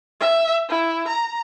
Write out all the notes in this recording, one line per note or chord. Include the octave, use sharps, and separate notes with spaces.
E5
E4
A#5